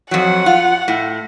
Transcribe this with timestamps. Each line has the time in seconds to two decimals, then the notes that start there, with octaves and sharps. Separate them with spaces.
0.11 F2 F#3 F#5
0.46 F4
0.88 A2